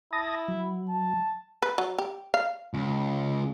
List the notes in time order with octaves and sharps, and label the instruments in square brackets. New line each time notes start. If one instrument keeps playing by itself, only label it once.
[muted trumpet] E4 [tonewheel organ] A5 D#6 A#6
[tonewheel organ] F#3
[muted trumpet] A5
[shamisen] B4
F#3
G4
F5
[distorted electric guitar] C#2